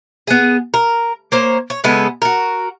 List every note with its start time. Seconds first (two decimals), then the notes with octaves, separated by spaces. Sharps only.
0.27 B3 G#4
0.74 A#4
1.32 A#3 C5 C#5
1.70 C#5
1.84 C#3 G#3 B3 A4
2.22 F#4 A#4